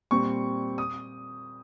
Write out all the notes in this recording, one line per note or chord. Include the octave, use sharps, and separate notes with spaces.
A#2 G3 C4 C#6
D#6